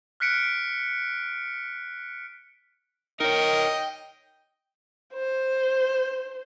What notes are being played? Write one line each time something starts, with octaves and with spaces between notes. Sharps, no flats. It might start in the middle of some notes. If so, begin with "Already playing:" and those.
F6 F#6 B6 C#7 D7
D#4 A#4 C#5 D#5 G5
C5